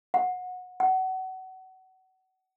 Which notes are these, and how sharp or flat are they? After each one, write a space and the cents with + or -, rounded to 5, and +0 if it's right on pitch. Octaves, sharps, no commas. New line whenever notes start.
F#5 -25
F#5 +30